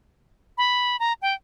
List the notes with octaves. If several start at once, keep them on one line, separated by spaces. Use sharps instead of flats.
B5
A#5
G5